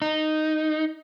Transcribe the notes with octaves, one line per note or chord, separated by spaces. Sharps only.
D#4